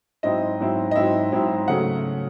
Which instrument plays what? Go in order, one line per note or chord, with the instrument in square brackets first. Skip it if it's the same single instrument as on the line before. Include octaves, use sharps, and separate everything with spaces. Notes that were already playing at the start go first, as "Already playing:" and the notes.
[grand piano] G#2 F#3 C4 E4 D#5
G#2 F#3 C4 E4
D#5
G#2 F#3 C4 E4 E5
G#2 F#3 C4 E4
C#3 F#3 A3 F#5